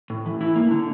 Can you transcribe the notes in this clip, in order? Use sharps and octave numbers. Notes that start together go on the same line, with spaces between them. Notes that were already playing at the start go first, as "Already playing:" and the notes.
A2
E3
E4
A#3
D3